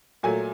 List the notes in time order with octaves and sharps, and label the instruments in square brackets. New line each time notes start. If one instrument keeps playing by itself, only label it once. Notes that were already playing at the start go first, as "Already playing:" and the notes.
[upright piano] A#2 F#3 A3 G#5